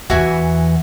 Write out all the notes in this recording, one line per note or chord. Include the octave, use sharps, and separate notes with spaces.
E2 E3 F#4 E5 G#5